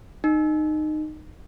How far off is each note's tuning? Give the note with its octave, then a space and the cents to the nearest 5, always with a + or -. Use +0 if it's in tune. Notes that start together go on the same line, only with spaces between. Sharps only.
D#4 -20